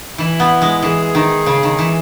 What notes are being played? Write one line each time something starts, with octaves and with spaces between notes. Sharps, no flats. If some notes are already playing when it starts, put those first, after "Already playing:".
E3 E4
B3
G#3
E3 G#4
D#3
C#3
D#3
E3